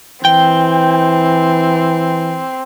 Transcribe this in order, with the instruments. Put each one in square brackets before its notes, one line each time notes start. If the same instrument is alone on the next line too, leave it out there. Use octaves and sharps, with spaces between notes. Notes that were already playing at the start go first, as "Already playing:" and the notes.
[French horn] E3 [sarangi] C4 [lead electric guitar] G5